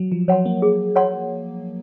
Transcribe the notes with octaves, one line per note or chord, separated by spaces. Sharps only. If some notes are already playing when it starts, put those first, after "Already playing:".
Already playing: F#3
F3
F#3 C#5 F#5 C6
A#3
G#4
C#5 F#5 C6